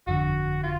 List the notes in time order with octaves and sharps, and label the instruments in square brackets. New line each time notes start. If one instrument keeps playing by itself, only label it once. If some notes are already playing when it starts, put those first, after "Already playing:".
[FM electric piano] G1 F2 D3 [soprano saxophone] F#4
[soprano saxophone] F4